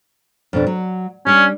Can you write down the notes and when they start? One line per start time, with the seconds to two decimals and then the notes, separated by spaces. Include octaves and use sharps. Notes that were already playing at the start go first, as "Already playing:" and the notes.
0.53 F2 B2 D4
0.67 F#3
1.27 G3 C#4 D4